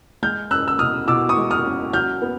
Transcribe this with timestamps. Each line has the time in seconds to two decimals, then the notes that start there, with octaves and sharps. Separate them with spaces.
0.23 G#3 F6 G6
0.51 C#4 E6 F#6
0.68 E6
0.79 B2 D#6 F6
1.08 B2 D6 E6
1.29 C#6 D#6
1.37 G#3
1.51 D#6 F6
1.65 C#4
1.93 F#3 F6 G6
2.22 B3